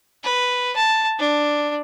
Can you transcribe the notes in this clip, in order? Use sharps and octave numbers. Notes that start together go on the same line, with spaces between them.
B4
A5
D4